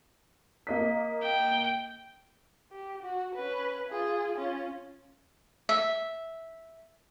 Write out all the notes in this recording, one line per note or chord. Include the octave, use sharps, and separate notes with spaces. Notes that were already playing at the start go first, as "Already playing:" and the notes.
A#3 D#5 B6
G5
G4
F#4
C#4 B4
F4 G#4
C#4 F4
E5